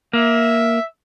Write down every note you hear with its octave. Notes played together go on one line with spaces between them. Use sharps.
A#3 E5